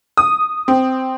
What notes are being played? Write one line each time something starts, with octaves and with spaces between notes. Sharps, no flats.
D#6
C4